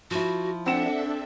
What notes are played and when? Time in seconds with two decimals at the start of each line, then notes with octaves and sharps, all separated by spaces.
0.11 F3 E4 F#4
0.66 C4 D4 A4 E5 F#5 E7